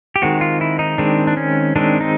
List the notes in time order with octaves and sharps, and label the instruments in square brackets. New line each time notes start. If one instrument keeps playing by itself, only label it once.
[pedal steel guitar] G4
D#3 G#3 C4 F#4
F4
E4
D#4
D#3 G#3 C4 D4
D4
C#4
D#3 G#3 C4 D4
D#4